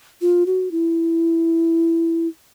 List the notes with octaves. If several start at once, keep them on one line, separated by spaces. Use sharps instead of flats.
F4
F#4
E4